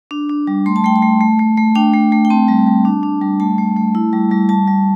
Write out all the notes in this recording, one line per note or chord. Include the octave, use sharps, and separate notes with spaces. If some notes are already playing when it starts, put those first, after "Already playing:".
D4
D4
G3
A3 C6
A5
A3 G5
A5
A3
A3
A3
A3
D4 G5
A3
A3
G5
C4 A5
G3
G3
D4
D4
G3
A3 A5
A3
A3
E4
G3
G3
G3 A5
G3